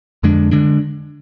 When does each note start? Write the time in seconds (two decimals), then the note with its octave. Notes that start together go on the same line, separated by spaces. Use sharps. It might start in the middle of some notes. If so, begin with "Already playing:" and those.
0.23 F2 D3 G#3 D4
0.51 D3 G#3 D4